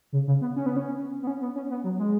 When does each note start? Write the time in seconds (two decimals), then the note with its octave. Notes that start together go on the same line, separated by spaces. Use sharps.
0.13 C#3
0.27 C#3
0.42 B3
0.56 C#4
0.66 B3
0.76 C#4
1.22 B3
1.27 C#4
1.41 B3
1.55 C#4
1.70 B3
1.84 F#3
1.99 G#3